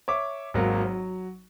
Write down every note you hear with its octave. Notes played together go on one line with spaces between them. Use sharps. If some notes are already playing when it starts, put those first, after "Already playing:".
C#5 E5 D6
G#1 F#3 A#3
F#3